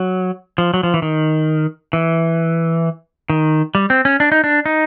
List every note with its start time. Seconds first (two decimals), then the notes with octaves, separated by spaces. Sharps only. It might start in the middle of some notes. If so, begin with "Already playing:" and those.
Already playing: F#3
0.58 F3
0.74 F#3
0.83 F3
0.94 E3
1.02 D#3
1.93 E3
3.30 D#3
3.75 G3
3.90 C4
4.05 C#4
4.20 D4
4.32 D#4
4.44 D4
4.66 D#4